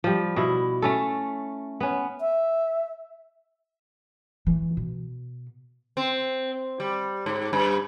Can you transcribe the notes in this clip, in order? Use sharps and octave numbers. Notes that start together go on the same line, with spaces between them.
F3 G3
B2 E4
A3 C#4 A4
B3 C#4
E5
E3 A3
B2
C4
G3
G#2
G2